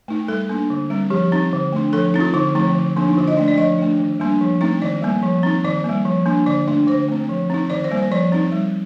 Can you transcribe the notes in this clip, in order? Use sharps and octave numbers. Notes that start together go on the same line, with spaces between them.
A3 D#4
G3 A4
A#3 D4
D3
G3 C4
F3 G4
C4 D#4
D3
A3 D4
F3 A4
C4 D#4
F4
D3 D#4
F3 A3 C4 D#4
D3
F3 A#3 D4
D#4
D3 F4
D#5
A3 D4 D5
D5
F3 D#5
A3 D4
D#3
G3 A#3 D4
F3
A3 C4 D#4
D#3 D5
G3 A#3
F3
C4 D#4
D#3 D5
G3 A#3
F3
A#3 D4
D3 D5
A3 D4
D3 C5
A3 C4
F3
C4 D#4
D#3 D5
C5
G3 A#3
C5
F3 D5
C4 D#4
G3